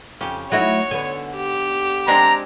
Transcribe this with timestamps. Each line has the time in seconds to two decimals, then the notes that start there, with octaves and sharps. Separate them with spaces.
0.21 F2 C#3 G4
0.52 F#3 A3 D#4 E4 F#4 C#5
0.91 D3 B3 G#5
1.36 G4
2.08 G#3 C4 D4 A#5